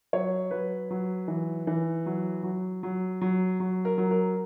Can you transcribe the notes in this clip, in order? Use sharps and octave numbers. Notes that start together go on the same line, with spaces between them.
F#3 C#5
F#3 B4
F#3
E3
E3
F#3
F#3
F#3
F#3
F#3
A#4
F#3
A#4